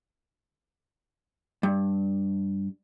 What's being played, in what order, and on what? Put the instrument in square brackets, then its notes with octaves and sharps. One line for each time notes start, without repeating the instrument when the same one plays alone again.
[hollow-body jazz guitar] G2